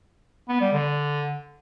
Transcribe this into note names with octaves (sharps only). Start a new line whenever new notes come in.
B3
G3
D3